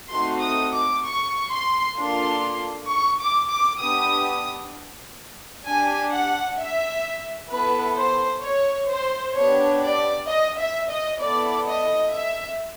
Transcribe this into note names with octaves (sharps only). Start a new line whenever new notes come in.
A3 C4 D#4 F#4 A4 C6
D#6
D6
C#6
C6
A#3 D4 F4 A4 C6
C#6
D6
D6
B3 D4 G4 D#6
D4 G4 G#5
F#5
E5
B3 E4 A4 B4
C5
C#5
C5
B3 D4 G4 C#5
D5
D#5
E5
D#5
B3 E4 A4 D5
D#5
E5